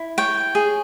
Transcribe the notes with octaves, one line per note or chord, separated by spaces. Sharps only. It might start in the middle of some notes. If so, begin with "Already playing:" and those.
Already playing: E4
C#5 G5
G#4